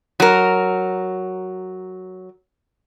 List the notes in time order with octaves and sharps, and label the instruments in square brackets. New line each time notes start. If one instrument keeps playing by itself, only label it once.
[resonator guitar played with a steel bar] F#3 A#4